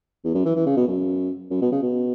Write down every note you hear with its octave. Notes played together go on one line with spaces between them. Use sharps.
E2
F#2
E3
E3
C#3
B2
F#2
F#2
B2
C#3
B2